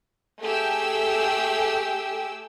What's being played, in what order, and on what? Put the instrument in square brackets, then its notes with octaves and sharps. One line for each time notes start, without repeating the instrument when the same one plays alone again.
[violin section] A3 G4 G#4 G5 E6